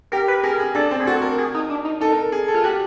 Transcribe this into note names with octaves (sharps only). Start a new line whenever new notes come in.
G4 A#4
B4
G#4 A#4
G#4
D4 A4
C4
G#4
F#4 A4
A#4
G#4
D#4
D4
D#4
D#4 A4
A#4
G#4
A4
F4
F#4 G4